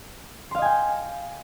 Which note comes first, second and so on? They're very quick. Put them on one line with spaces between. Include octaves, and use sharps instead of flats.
C6 F5 D#5 G#5 G5